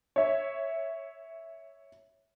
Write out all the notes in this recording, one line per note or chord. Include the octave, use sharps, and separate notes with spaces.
C#5 E5